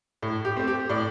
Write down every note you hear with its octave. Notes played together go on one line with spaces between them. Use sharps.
A2
G4
A3 C4
G4
A2 D5